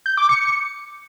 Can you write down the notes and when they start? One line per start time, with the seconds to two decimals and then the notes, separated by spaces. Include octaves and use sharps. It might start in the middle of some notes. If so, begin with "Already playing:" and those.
0.06 G6
0.17 D6
0.29 C#7